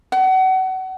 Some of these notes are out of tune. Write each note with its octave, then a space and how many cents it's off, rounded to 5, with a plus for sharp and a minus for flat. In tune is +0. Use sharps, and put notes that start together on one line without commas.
F#5 +30